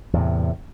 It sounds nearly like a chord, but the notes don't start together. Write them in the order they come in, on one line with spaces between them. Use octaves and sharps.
E2 A2 C3